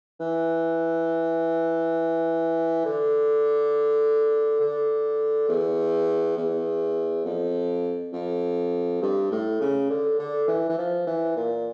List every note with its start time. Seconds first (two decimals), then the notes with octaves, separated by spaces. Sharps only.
0.20 E3
2.85 D3
4.60 D3
5.48 E2
6.37 E2
7.25 F2
8.13 F2
9.02 G2
9.31 A2
9.61 C#3
9.90 D3
10.19 D3
10.48 E3
10.69 E3
10.78 F3
11.07 E3
11.36 A#2